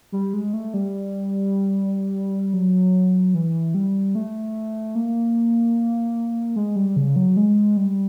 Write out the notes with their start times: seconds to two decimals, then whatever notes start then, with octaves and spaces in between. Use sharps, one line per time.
0.12 G3
0.34 G#3
0.54 A3
0.74 G3
2.54 F#3
3.34 E3
3.74 G3
4.15 A3
4.95 A#3
6.56 G#3
6.76 G3
6.96 C#3
7.16 F#3
7.37 G#3
7.77 G3